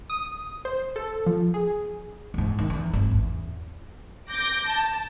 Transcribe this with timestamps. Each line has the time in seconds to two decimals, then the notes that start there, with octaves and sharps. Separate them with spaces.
0.10 D#6
0.65 C5
0.96 A4
1.26 F3
1.54 G#4
2.34 E2 G#2
2.59 D#3
2.70 E2 E3
2.93 G#1 F#2
3.11 A1 E2
4.30 D6 G6 A#6
4.68 A5